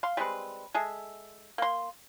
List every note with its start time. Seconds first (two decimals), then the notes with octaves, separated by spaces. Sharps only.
0.03 F5 C6
0.17 G3 G#3 C4 B4
0.74 G#3 G#4 A4 E5
1.58 A#3 C6